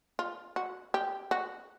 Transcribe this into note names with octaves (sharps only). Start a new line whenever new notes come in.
F4
F#4
G4
F#4